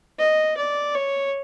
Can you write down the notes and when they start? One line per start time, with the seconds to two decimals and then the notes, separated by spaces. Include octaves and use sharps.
0.19 D#5
0.57 D5
0.95 C#5